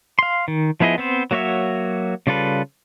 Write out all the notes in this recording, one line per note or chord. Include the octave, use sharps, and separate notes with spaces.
F5 C6
D#3
F3 B3 E4 G#4 D#5
B3 C4 C5
F#3 A#3 F#4 C#5 E5
C#3 G3 F4 A4 B4